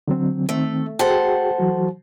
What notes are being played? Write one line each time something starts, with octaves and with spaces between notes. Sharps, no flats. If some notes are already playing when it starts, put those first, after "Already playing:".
D3 F#3 C4
D#3 A3 C4
F#4 G#4 A4 C5 F#5 G5
E3 F#3 F#4